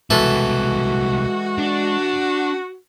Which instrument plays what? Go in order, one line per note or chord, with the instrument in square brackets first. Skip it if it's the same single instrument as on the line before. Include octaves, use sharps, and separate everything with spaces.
[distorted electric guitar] C2 B2 [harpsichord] E3 A4 [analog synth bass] G#3 [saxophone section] F#4
[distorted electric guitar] D4